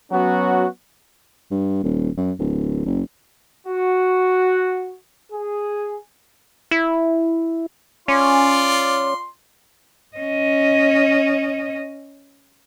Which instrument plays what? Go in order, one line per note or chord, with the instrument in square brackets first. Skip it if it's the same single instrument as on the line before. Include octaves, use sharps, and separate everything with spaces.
[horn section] F#3 B3 C#4 F#4
[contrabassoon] G2
D#1
F#2
D1
F#1
[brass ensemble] F#4
G#4
[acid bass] E4
[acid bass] C#4 [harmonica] F4 D5 C6
[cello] C#4 D#5